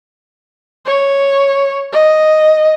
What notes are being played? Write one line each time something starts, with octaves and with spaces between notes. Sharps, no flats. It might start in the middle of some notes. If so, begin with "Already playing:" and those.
C#5
D#5